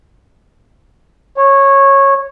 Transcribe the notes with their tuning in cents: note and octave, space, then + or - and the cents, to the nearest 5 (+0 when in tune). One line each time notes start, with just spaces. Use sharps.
C#5 -15